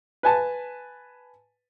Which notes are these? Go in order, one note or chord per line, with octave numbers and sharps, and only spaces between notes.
B4 G#5 A5